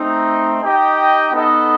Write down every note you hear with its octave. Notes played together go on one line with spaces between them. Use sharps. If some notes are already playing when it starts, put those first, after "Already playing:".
Already playing: A3 C4 D#4
D#4 G4 D#5 G5
B3 D#4 A4 D#5